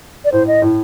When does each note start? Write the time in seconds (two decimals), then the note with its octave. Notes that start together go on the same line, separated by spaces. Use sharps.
0.25 D5
0.32 A2 C5
0.47 D#5
0.62 A2